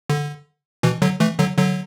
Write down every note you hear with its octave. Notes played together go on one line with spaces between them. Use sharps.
D3
B2 E3
D3 F#3
E3 A3
D3 F#3
D3 F#3